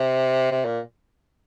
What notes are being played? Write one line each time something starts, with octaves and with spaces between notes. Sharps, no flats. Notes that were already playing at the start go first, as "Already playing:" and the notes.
Already playing: C3
C3
A#2